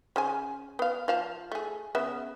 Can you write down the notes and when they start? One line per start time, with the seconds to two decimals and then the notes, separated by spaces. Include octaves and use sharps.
0.16 C#3 C5 G#5
0.79 B3 F5
1.08 F3 F5 A5
1.52 A3 G#4
1.95 C#3 B3 E5